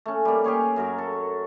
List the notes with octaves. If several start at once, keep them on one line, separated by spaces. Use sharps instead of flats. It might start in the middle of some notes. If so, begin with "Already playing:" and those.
A3 C#4
G3 A#3
G4 G#4 C#5 F5
F#2 F#3 A#4
A4